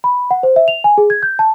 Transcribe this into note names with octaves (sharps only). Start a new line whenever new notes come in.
B5
F#5
C5
E5
F7
G#5
G#4
G#6
G6
A5